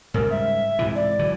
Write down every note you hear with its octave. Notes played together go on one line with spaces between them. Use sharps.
G#2 C#3 G3 A#4
E5
G#2 C3 E3
D5
D3 E3 F#3